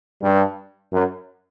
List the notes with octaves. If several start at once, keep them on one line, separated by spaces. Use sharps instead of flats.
G2
F#2